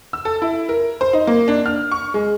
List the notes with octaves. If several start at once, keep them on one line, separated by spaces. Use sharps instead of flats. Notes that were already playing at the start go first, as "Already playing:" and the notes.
E6
A4
E4
A#4
C5
D#4
A#3
D4
F6
C#6
G#3